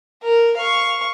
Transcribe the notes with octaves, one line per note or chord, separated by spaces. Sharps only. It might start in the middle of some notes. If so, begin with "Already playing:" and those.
A#4
F5 C#6